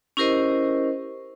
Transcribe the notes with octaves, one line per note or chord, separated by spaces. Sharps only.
C#4 E4 G4 A#4 C5 D#5